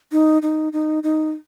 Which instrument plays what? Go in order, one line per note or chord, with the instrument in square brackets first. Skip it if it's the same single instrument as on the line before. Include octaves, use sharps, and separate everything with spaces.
[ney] D#4
D#4
D#4
D#4